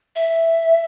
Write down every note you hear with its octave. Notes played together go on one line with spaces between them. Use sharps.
E5